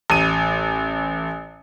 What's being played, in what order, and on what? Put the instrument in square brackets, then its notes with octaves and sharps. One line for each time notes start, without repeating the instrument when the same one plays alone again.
[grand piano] A1 D#7